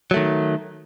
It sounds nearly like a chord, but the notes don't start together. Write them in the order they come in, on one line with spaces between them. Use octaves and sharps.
F#3 A3 D#3